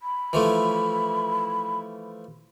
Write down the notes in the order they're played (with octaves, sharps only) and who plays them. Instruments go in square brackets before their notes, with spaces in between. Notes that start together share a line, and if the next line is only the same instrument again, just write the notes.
[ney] B5
[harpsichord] E3 F3 A3